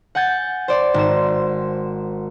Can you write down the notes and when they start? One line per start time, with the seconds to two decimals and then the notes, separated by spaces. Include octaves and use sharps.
0.15 F#5 G#5 G6 A6
0.68 C5 D5
0.94 G#1 E7